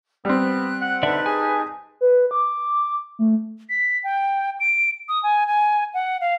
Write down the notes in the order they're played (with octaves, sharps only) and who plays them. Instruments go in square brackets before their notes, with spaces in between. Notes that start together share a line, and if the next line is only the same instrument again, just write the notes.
[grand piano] G3 C4 [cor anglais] B3 [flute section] F#6
[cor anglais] F#5
[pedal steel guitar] D3 D5 E5 [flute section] D#4 B4 A5
[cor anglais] G#4 [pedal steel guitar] G#5
[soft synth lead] B4
D6
A3
[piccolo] B6
G5
D7
D#6
G#5
G#5
F#5
F5